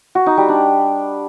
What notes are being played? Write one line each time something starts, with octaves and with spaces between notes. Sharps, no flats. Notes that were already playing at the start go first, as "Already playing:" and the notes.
F#4
D#4
G3
D4